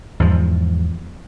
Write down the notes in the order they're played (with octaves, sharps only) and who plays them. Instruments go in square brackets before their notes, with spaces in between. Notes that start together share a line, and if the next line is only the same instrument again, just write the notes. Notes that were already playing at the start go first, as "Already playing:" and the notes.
[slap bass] E2 G#2 F3